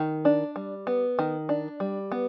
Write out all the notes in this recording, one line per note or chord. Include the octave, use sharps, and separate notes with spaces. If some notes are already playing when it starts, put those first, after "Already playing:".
Already playing: D#3
D4
G3
B3
D#3
D4
G3
B3